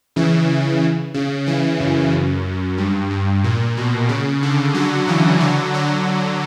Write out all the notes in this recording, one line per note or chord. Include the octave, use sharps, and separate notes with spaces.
C#3 E3
C#3
C#3 E3
F#2
G2
G2
A#2
B2
C#3
D3
D3 F#3
C#3 E3
D3 F#3
D3 F#3